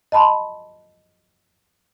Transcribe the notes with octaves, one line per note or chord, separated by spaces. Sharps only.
D#5 A5 B5 C6